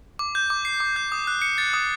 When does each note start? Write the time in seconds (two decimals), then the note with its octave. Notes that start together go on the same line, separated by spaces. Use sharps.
0.19 D6
0.35 G6
0.50 D6
0.65 C7
0.80 D6
0.96 G6
1.12 D#6
1.27 F#6
1.42 C#7
1.58 A6
1.74 D#6